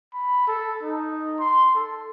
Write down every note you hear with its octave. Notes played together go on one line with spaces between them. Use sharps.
B5
A4
D#4
C6
A4